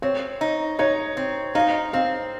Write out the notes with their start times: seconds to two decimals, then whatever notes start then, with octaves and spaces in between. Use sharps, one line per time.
0.02 C4 C#5
0.41 D#4
0.79 D#4 C#5
1.17 C4
1.55 D#4 F5
1.93 C4 F5